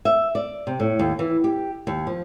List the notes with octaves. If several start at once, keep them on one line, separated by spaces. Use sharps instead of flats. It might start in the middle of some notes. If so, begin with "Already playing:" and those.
E5
D5
C3
A2
D#2
E3
G4
D#2
F3